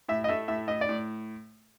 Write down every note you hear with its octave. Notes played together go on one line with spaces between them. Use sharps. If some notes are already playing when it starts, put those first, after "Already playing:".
A2 E5
D#5
A3 E5
A2 E5
A2 D#5
D5
A2